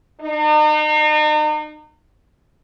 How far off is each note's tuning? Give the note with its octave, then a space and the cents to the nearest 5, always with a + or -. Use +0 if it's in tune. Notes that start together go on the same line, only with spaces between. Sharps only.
D#4 -40